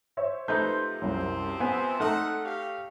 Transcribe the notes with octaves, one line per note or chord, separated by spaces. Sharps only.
C5 C#5 E5
C3 F3 A3 D#4 B4 C5 G6
C2 F#2 C4
B3 G#5
A3 D#4 A4 D#5 F#5 F6
G4 C#5 F5